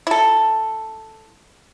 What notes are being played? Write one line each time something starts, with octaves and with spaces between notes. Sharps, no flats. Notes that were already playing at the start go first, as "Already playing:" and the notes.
E4 A4